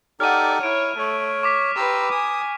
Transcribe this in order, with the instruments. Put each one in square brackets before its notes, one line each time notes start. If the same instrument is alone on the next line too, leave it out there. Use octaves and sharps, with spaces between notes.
[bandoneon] D#4 G4 A4 [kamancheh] D5 F#5 [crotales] F6 D#7
[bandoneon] E4 [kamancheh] C#5 [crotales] F6 D7
[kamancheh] A3 [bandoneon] C#5
[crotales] C#6 D6 B6
[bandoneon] G4 A#5 E6 [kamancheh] B4 C6
[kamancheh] G#5 [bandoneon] D#6